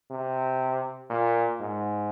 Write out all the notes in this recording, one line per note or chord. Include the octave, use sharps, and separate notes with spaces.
C3
A#2
G#2